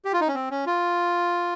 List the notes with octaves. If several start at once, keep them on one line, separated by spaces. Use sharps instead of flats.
G4
F4
D#4
C#4
C4
C#4
F4